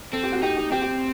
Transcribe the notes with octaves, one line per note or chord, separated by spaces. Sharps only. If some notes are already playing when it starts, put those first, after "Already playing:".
C4 A4
G4
F#4
D#4 G4
G4
C4 G4
G4